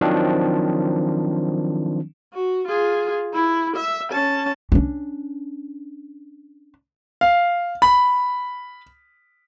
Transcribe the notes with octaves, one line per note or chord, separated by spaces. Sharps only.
D#3 F3 F#3 C4 D4
F#4
F4 G#4
E4
E5
C#4 A5
C#4 D4
F5
B5